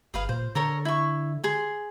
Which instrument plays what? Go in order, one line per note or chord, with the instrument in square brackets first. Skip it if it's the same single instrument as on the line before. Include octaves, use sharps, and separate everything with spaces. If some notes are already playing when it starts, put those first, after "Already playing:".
[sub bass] G1 [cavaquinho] G#4 B4 F5
[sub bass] A#2 [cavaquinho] C5
[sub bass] D3 [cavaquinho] A4 A#4 C#5
[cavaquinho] E4 C#6
G#4 C6